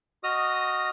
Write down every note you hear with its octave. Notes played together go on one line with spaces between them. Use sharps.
F#4 D#5 D#6 F6